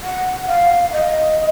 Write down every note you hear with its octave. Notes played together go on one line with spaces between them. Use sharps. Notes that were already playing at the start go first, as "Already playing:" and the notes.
F#5
F5
D#5